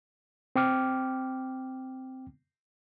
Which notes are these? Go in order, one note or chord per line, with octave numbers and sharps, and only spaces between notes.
C4 G5 D6 F6